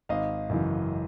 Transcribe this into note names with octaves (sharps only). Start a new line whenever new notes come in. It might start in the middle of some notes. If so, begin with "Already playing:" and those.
G#1 D#5 F5
F#2 C#3 E3